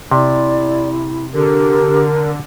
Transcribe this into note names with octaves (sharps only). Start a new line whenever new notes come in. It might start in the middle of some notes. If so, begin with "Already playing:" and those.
C3 E4 D5
D3 G4 A#4